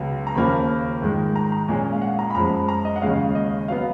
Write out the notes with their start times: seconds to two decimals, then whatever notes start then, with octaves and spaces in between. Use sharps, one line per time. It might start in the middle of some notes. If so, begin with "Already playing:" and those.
Already playing: C#2 C#3 F#3 B3
0.27 A#5
0.35 D#2 C#3 F3 A#3 C#4 B5
1.02 G#2 D#3 G#3
1.36 A#5
1.52 A#5
1.68 A#2 G#3 C#4 G#5
1.93 F5
2.02 F#5
2.19 A#5
2.30 B5
2.35 F#2 F3 G#3 A#5
2.68 A#5
2.85 D#5
2.96 F#5
3.02 D#2 C#3 G#3 C#4 F5
3.35 D#5
3.68 F#3 B3 F5